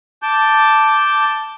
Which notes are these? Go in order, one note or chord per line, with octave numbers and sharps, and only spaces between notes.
A5 D6 G6